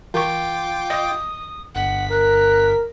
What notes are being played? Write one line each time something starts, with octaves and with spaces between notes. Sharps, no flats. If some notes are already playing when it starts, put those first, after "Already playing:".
E3 F4 G5 C#6 D6
D#5 D#6
G1 F#5 B6
A#4 F#6